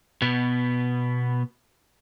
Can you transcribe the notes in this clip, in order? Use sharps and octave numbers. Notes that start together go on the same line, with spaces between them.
B2 B3